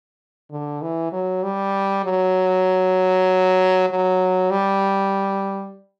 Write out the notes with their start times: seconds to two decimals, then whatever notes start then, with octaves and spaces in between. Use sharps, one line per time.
0.51 D3
0.82 E3
1.12 F#3
1.43 G3
2.04 F#3
3.89 F#3
4.50 G3